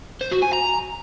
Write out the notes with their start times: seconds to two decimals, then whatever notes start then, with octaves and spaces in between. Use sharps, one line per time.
0.21 C5
0.32 F#4
0.43 G#5
0.53 A#5